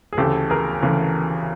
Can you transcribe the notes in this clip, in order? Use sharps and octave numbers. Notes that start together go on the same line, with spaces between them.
G#4
D2 C#3 E3 A3 G4 A4
G#4 A#4
D2 C#3 E3 A3